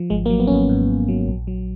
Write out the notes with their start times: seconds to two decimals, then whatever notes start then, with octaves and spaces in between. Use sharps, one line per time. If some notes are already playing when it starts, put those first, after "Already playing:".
Already playing: F3
0.10 G#1 G#3
0.26 A#3
0.30 F#3
0.40 B3
0.47 C#4
0.50 G#1 B3
0.69 G#2
0.89 G#1
1.08 F#3
1.27 A#1
1.47 F#3